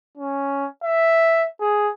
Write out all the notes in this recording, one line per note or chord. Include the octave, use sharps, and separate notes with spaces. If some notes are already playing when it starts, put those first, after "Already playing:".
C#4
E5
G#4